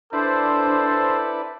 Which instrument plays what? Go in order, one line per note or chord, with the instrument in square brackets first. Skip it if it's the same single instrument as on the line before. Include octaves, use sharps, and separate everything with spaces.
[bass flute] D4 [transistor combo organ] E4 B4 D5 [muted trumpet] A4 [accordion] C5